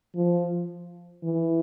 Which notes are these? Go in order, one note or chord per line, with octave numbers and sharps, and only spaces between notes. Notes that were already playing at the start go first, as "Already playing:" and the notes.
F3
E3